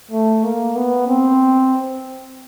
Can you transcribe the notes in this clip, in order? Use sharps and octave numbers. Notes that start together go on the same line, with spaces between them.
A3
A#3
B3
C4